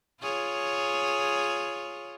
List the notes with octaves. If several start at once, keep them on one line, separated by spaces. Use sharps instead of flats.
F4 G#4 C#5